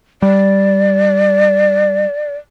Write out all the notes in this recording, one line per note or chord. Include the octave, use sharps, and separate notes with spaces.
G3 D5